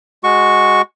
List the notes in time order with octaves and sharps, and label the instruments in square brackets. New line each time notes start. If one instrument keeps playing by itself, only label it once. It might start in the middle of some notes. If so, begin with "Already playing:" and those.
[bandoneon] G#3 F#4 C#6